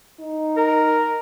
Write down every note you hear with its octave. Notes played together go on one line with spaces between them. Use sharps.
D#4
A#4